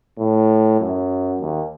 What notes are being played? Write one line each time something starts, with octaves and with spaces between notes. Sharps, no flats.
A2
F#2
D#2